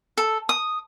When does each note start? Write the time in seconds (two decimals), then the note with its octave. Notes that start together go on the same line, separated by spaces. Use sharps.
0.18 A4
0.49 D#6